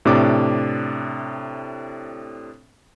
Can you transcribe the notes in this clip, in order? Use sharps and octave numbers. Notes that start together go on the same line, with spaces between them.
A2 C3 D4 D6